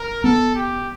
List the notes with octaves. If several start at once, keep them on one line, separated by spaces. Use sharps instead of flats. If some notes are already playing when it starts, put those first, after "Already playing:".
Already playing: A#4
B3 A4
G4